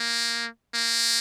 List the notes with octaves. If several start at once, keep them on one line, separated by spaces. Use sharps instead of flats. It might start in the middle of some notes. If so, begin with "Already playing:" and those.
Already playing: A#3
A#3